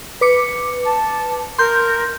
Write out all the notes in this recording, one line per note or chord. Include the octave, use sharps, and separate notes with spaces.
B4 D6 C#7
A5
A#4 C6 G6